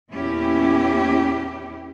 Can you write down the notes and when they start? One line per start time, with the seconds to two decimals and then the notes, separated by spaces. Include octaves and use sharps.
0.12 E2 A#2 C#4 E4 G4